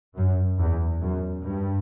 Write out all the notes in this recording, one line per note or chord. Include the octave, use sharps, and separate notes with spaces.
F#2
E2
F#2
G2